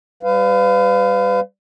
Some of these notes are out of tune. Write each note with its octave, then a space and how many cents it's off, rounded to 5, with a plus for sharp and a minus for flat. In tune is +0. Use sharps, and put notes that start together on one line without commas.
G3 -10 B4 +35 F5 +0